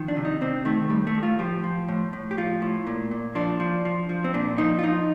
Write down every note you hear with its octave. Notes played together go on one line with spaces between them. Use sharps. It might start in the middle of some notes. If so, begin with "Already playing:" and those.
Already playing: D#3 F3
D4
C3
D#4
C3 C4
D#3 A3
A2 G3
A3
A2
F4
F3 G4
F3
A2
A2
G4
F3 F4
A2
A#2
A#2
F3 D4
F3
F3
F3
C4
A#2 D4
F3 D#4
F4
F3 D#4